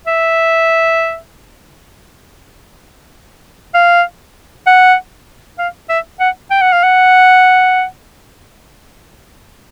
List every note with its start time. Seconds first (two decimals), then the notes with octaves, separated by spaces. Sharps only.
0.07 E5
3.74 F5
4.67 F#5
5.58 F5
5.89 E5
6.20 F#5
6.51 G5
6.61 F#5
6.73 F5
6.83 F#5